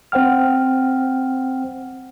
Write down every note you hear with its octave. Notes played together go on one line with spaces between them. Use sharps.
C4 C5 F#5 G5 F6